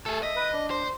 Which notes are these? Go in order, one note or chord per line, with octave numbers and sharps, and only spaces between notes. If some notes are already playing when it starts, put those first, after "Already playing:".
A3 G#4 A4
D#5 E5
B4
D4
C5